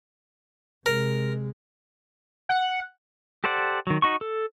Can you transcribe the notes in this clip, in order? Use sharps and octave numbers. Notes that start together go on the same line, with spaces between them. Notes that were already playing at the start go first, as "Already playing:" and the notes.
C3 G#3 A#4
F#5
G4 A4 C5 D5 F#5
D#3 F#3
D#4 F#4 C#6
A4